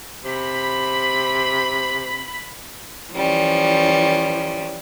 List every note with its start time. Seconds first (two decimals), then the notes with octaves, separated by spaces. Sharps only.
0.24 C3 B5
3.13 E3 F3 G3 C#4